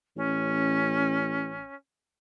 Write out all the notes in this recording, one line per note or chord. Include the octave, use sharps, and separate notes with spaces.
A1 C#4